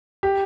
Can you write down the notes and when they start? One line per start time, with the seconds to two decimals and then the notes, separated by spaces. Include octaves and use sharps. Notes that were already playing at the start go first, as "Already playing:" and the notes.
0.23 G4